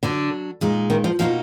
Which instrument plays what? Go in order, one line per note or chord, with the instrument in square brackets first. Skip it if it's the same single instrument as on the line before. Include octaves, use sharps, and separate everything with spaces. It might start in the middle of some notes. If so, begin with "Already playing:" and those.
[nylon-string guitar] D3 [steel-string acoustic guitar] F#3 D4 F#4
[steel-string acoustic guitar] A#2 G#3 D#4
[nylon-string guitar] D#3
F3
[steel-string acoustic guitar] B2 A#3 D#4 F#4 [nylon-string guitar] F3